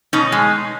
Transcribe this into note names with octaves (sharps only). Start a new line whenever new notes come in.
B2 C#4 D#4
G#3